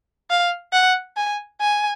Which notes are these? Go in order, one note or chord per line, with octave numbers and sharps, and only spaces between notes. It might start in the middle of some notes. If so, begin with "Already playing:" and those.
F5
F#5
G#5
G#5